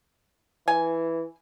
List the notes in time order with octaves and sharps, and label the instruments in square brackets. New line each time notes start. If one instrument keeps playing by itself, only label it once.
[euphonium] E3 [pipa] G#5